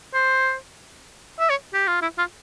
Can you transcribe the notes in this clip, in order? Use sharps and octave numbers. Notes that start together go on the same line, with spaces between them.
C5
E5
C#5
G4
F4
E4
F4